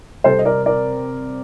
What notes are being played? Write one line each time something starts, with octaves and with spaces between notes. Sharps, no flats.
C3 G3 C4 A4 C5
D#5
A#4 D5
A#4 D5